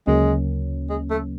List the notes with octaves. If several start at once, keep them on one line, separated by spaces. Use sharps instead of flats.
D2 C#3 F#3 G#3 A#3 C#4
G#3
A3